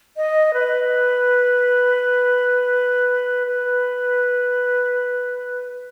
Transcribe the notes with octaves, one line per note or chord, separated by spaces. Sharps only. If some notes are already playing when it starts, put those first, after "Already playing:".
D#5
B4
B4